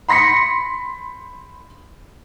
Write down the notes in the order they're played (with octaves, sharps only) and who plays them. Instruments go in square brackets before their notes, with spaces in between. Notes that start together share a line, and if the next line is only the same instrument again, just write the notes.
[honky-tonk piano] B5 C6 A#6 B6 C#7